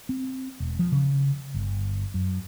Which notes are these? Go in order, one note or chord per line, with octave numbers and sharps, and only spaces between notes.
C4
E1
F3
C#3
G1
F#2